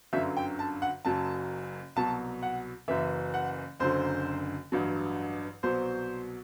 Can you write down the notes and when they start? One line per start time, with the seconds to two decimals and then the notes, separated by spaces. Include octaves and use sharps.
0.13 G1 F#2 D3 F#3 E5
0.37 G5
0.59 A5
0.82 F#5
1.05 F#1 F#2 F#3 A5
1.96 C2 B2 F#3 A5
2.43 F#5
2.88 F#1 F#2 E3 E5
3.34 F#5
3.80 F#1 F#2 D3 F#3 C5
4.72 A1 G2 F#3
5.63 C2 B2 F#3 C5